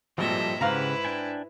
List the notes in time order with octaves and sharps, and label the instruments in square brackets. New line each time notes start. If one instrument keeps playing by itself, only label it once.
[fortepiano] G#1 G2 A#2 [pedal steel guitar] F3 G3 A4 [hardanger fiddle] D#5 E5
[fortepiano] G#2 F5 A#5 [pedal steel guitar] C#3 G4 F#5 [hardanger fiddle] E4 B4
[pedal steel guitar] D4 G5 G#5